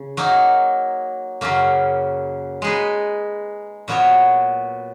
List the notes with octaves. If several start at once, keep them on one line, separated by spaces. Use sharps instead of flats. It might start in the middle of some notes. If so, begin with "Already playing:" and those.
Already playing: C#3
F#3 A#3 D#4
F#2 C#3 F#3 A#3
G#3 D#4 G#4 B4
A#2 F#3 B3 F#4 C#5